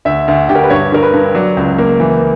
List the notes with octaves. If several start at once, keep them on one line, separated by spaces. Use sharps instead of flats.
D2 E5
D2
D2 G4
A#4
B4
G2 C#5
D3 A#4
B4
G2
F#3 D5
C#2
A#3
E3